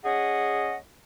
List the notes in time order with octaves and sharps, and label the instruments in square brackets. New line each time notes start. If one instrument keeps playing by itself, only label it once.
[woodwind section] C#4 G#4 D#5 F#5